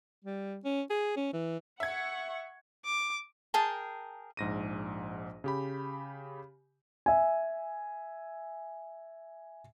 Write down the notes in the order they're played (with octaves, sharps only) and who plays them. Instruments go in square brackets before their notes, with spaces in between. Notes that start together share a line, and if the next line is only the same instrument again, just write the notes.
[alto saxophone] G3
C#4
G#4
C#4
E3
[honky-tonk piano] E5 G#6 [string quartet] F#5 C#6
[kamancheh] D6
[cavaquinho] G#4 A#4 G5 A5
[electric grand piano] A#1 G#2 A#6 D#7
C#3 G4 B5
[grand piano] E5 G#5